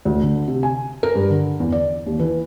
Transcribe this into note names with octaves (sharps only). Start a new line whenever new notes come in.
D2
D3
C3
G#5
A#4
G2
D3
E2
D5
D#2
E3